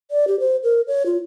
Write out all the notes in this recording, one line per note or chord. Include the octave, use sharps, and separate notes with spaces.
D5
G4
C5
A#4
C#5
F4